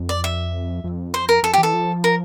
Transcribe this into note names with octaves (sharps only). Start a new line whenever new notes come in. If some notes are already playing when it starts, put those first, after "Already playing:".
Already playing: F2
D5
E5
F2
C5
A#4
F2 A4
G4
E3
A4
F3
A#4